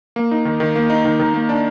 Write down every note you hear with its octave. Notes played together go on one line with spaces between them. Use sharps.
A#3
D#4
D#3
D#3
A#3
D#4
D#3
D#3
A#3
D4